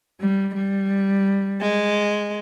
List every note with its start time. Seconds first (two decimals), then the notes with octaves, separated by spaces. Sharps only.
0.21 G3
0.56 G3
1.61 G#3